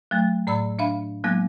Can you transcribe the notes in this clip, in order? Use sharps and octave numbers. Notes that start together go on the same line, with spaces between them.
F#3 A3
A2 D5 B5 E6
D4 E5 F5 B5
F#3 G#3 A#3 B3 E4